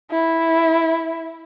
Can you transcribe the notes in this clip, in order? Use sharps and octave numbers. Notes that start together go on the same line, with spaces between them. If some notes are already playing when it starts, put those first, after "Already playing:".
E4